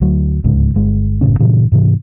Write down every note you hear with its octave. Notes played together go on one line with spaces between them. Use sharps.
D2 F#3
D1 C#2 G#2
G1 G#3
F#1 A2 C#3 C#4
G2 A#2 C#3 E3
G#2 C3 E3